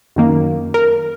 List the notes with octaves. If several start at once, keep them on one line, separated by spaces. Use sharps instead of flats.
F#2 D#3 A#3
A#4